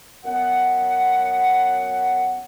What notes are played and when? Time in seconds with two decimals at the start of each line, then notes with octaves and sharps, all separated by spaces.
0.25 F#2 B3 F#5